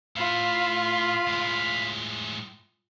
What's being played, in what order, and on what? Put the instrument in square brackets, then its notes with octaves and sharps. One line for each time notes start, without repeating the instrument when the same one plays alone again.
[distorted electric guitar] A2 [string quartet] F4 [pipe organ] F5 B5
[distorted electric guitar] A2 G#3